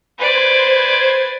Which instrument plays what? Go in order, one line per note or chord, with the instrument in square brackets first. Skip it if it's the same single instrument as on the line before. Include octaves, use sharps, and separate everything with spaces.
[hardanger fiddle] B4 D5 [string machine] C5 G#6